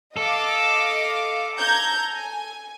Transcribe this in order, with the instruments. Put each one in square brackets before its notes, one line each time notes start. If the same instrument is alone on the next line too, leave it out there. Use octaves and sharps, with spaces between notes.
[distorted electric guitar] A4 [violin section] D#5 F5 D6
[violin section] A#5 G6 G#6
G#5